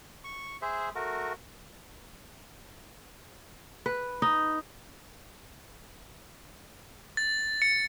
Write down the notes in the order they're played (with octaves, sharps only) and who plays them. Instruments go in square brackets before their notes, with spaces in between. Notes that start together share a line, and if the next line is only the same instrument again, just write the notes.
[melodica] C#6
G#4 C5 E5
A3 F#4 A#4
[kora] B4
D#4
[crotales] A6
C#7